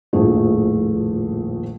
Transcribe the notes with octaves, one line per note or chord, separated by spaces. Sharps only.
D#1 A#1 F2 A2 A3 G#4